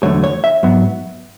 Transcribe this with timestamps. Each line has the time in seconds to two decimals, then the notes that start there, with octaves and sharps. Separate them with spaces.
0.03 E2 D3 F#3 A3 C#5
0.24 C#5
0.44 E5
0.63 G#2 F#3 B3